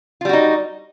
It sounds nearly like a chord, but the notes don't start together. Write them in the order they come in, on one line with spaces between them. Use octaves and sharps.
F4 G3 F#4 D#4